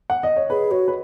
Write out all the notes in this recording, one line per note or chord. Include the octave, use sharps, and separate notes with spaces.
F#5
D#5
C#5
G#4 B4
F#4 C#5
B4